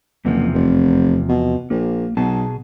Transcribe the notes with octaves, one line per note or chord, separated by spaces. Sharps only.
F#1 E2 C3 F3
F1
B2
A#1 A#3
B1 B2 G#4 A5